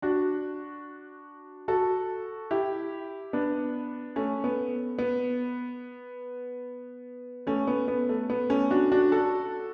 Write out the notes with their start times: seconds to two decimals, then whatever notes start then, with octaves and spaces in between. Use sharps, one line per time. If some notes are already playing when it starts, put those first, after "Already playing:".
0.02 D4 F#4
1.68 F#4 A4
2.51 E4 G4
3.33 B3 D4
4.16 A3 C#4
4.44 B3
4.99 B3
7.47 A3 C#4
7.67 B3
7.88 B3
8.09 A3
8.30 B3
8.50 A3 C#4
8.70 D4 F#4
8.92 D4 F#4
9.12 F#4 A4